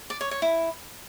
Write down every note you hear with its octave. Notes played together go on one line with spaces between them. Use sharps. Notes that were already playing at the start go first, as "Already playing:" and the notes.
D5
C#5
C#5
E4